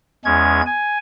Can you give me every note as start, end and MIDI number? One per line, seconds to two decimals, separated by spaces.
0.25 0.61 40
0.25 0.61 56
0.25 0.61 61
0.25 0.61 92
0.66 0.98 80